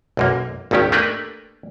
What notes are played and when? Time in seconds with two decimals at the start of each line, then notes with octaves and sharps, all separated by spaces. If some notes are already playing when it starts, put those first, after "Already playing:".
0.17 B1 F#2 A#3
0.71 G#1 D#2 D#3 C#4 G4
0.92 A3 A#3 D4 G4 A#4 B4